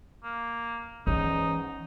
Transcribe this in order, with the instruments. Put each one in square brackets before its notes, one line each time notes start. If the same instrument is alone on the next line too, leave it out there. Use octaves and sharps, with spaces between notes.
[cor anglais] A#3
[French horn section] E2 G#2 C#4 [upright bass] E3 [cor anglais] D#4